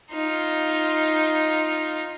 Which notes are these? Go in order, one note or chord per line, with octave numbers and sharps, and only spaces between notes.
D#4 F4